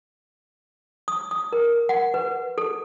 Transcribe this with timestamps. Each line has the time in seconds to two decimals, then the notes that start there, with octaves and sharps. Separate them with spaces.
1.08 D#6
1.31 D#6
1.52 A#4
1.89 F#5
2.14 B4
2.58 A4